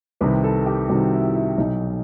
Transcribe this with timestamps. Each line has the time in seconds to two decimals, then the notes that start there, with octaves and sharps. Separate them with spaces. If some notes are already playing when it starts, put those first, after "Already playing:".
0.21 C2 C3 D#3 B4
0.44 A4
0.66 G4
0.89 C2 C3 D#3 F#4
1.13 E4
1.35 E4
1.57 B1 B2 D#4